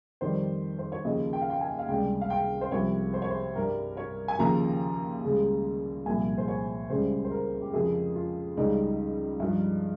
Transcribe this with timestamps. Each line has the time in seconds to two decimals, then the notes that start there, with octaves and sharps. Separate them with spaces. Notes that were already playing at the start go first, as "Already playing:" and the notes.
0.21 F2 D#3 G3 C5
0.79 C5
0.92 C#5
1.05 D#2 C#3 F3 D#5
1.33 G5
1.41 F5
1.50 G5
1.61 G#5
1.79 F5
1.88 C#2 C3 G3 G5
2.21 F5
2.30 G5
2.61 C5
2.71 C2 C3 F3 C#5
3.14 C5
3.22 C#5
3.30 C5
3.55 G2 G3 A#4
3.97 C#5
4.28 G#5
4.39 D#2 C#3 F3 A#5
5.23 C#2 C#3 G3
6.06 C2 A#2 F3 G#5
6.38 C5
6.48 C#5
6.90 C#2 C#3 G3 C5
7.25 C5
7.31 A#4
7.61 G4
7.73 F2 C#3 F3 G#4
8.15 F4
8.57 C#2 C#3 G3 D#4
9.40 G2 F3